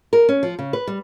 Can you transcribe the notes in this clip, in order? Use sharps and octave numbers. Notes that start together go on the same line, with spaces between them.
A#4
C#4
F3
C#3
B4
G3